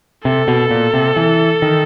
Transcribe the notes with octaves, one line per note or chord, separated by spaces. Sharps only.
C3 A4
B2
A#2
C3
E3
D#3